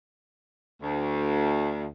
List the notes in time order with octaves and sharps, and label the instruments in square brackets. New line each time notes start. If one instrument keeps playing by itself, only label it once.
[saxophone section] D2